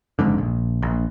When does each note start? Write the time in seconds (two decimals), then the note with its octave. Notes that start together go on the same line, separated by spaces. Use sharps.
0.19 F#1 F2 G#2 D3
0.38 A#1
0.82 A#1